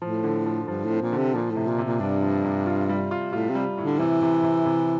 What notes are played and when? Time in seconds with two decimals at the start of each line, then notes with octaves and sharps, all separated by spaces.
0.01 A2 F3
0.24 D3
0.46 F3
0.68 G2 F3
0.85 A2
0.90 C4
1.02 A#2
1.12 D3
1.17 C3
1.34 A#2 F3
1.51 A2
1.56 C3
1.68 A#2
1.78 C3
1.85 A#2
2.00 G2 D4
2.23 F3
2.45 C3
2.67 F4
2.89 G3
3.11 F4
3.33 A2 F4
3.49 C3
3.55 G3
3.78 A2
3.83 D3
3.99 C3 E3
4.22 C3
4.44 C3
4.66 C3